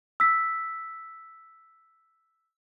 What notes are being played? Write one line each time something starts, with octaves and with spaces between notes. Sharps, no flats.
E6 B6